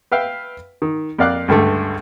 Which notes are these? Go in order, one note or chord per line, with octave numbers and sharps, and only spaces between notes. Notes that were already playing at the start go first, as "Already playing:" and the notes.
B4 E5 F5 G5
D#3
F2 A#3 D5 F5 D6 F#6
C#2 G2 D3 A3